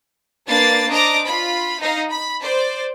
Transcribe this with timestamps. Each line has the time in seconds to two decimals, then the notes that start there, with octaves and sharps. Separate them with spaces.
0.47 A#3 D4 B4 A6 C7
0.88 D4 C5 D#5 A#5 D6
1.24 F4 B5
1.80 D#4 D#5 F5
2.10 B5
2.42 C5 D5